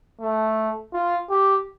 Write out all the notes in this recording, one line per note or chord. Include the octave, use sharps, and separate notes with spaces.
A3
F4
G4